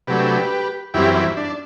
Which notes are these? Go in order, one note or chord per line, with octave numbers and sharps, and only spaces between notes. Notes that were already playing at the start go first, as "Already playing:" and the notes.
C3 F#3 A3 D4 G4 B4
F#2 E3 G3 C4 E4 G4
E4
D4